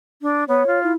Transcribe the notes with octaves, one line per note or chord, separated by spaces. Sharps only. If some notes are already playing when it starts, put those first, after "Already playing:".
D4
B3 C#5
F4
E4